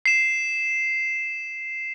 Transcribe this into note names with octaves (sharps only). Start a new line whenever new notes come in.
C7 E7